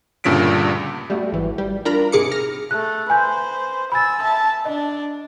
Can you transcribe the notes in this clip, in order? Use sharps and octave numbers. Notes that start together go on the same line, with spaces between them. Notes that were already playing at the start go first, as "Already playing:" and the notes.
D2 G2 A#2 C#3 B6 D7
G3 A3 F#4
G#1 E3
G3
D4 F4 A#4 A#5 B5
G#2 C3 G#4 D6 C#7
F6 A#6
A3 F#6
B4 C5 G#5 G6
G#5 B5 E6 A6
E5 A5
D4 D#5